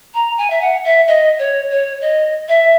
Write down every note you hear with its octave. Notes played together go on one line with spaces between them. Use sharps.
A#5
G#5
E5
F#5
E5
D#5
C#5
C#5
D#5
E5